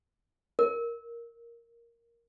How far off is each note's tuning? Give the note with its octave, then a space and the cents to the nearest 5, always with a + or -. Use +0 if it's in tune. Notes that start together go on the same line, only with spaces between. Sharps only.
A#4 +0